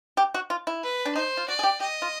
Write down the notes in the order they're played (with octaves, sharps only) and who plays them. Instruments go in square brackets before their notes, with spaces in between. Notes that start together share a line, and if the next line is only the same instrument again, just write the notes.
[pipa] G4
F#4
F4
E4
[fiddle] B4
[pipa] D4
[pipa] D#4 [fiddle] C5
[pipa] F4
[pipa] F#4 [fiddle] D5
[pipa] G#4
G4
[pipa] G4 [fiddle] D#5
[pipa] F4